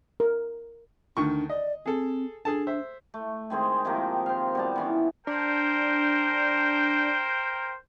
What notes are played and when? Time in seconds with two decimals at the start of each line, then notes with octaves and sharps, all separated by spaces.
0.20 A#4
1.17 D2 D#3 D4 C#6
1.50 D5 D#5
1.86 C4 G#4 A4
2.45 D4 G#4 A4 A5
2.67 C5 E5
3.14 A3
3.50 D#3 G#3 C4 G#4
3.85 C3 D#3 F3 A#3
4.26 C5 F5
4.55 B2 G3 A5
4.76 B2 E3 C#4
5.27 D4 A#4 C5 G5